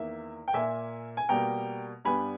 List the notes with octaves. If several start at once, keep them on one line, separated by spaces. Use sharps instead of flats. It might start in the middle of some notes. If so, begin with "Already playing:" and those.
Already playing: E2 D#3 A#3 E5
G5
A#2 A#3 E5 G#5
G#5
B2 G3 A#3 G5 A#5
G2 G3 B3 G#5 B5